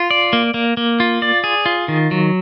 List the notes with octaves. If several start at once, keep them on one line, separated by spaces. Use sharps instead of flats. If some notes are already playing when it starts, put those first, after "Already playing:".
Already playing: F4
D5
A#3
A#3
A#3
F4
D5
G#4
F4
D#3
F#3